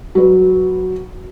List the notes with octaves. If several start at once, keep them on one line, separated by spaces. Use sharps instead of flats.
F#3 B4